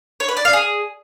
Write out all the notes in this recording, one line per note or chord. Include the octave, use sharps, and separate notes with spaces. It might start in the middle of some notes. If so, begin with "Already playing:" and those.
C#5
B4
D5
F5
G#4